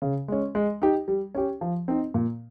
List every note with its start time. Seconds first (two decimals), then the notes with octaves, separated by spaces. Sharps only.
0.02 C#3
0.28 G#3 C#4
0.55 G#3
0.82 D#4 G4
1.08 G3
1.35 C#4 G4
1.61 F3
1.88 C4 D#4
2.14 A#2